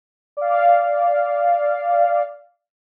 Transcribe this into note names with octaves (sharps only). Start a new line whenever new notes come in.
D5 F5